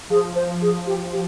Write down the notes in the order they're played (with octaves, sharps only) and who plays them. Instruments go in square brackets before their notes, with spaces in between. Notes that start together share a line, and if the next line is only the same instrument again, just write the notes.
[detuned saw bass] F3 [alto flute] G#4
[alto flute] C5
G#4
G4
G4